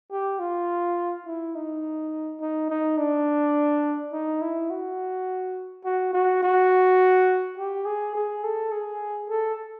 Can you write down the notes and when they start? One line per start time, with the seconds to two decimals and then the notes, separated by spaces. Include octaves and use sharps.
0.11 G4
0.40 F4
1.26 E4
1.55 D#4
2.41 D#4
2.70 D#4
2.98 D4
4.13 D#4
4.42 E4
4.70 F#4
5.85 F#4
6.14 F#4
6.43 F#4
7.58 G4
7.86 G#4
8.15 G#4
8.44 A4
8.72 G#4
9.30 A4